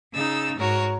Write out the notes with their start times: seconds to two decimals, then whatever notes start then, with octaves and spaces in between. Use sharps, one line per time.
0.12 C#3 D#4 E6 A6
0.56 G#2 F#4 A#4 C#5